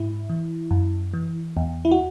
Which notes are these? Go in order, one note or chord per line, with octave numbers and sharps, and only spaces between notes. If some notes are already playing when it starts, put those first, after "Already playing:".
Already playing: G#2 E4
E3
F#2
E3
E2
E4
F#4